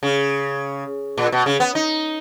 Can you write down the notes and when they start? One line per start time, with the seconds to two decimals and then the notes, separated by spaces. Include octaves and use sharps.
0.03 C#3
1.18 A#2
1.32 B2
1.46 C#3
1.60 B3
1.75 D#4